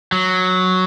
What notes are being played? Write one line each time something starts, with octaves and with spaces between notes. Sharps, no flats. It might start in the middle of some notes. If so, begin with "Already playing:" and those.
F#3